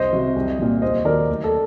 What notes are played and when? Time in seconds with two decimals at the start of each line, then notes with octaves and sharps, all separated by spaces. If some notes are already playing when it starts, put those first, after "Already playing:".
Already playing: C2 C5 D#5
0.13 C3 F#3
0.36 C2
0.59 A#2 F#3
0.82 D#2 C5 D#5
1.05 D#3 F#3 A#4 D5
1.29 D2
1.44 A4